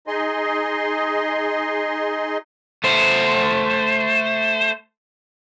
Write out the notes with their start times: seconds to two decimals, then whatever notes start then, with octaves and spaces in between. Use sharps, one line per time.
0.07 D#4 G#4 D#5 C6
2.84 A3 C5